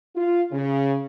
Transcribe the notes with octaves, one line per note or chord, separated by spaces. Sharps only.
F4
C#3